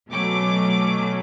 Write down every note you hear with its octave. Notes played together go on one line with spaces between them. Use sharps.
B2 F#3 A3 C#4 D6